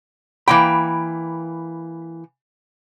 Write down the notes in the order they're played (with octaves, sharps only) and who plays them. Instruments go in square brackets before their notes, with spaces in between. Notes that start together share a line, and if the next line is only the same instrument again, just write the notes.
[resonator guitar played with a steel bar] E3 A#3 G5 [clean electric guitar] B5